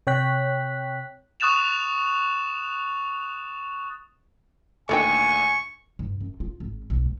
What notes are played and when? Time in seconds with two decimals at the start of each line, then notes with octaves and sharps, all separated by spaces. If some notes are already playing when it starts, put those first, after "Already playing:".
0.07 C3 C#5 G5 F#6 B6
1.40 C#6 D#6 F#6 A6 E7 F7
4.89 D2 A#2 D3 D#3 D4 G5 G#5 C#6
5.99 G2
6.20 F#2
6.40 F4
6.60 G#1
6.90 B1
7.05 A#2